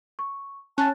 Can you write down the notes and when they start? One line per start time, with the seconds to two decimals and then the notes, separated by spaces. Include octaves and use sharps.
0.19 C#6
0.78 C#4 A5 F#6 A6